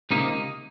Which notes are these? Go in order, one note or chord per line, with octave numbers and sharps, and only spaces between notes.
C#2 C3 D#3 A#3 D#4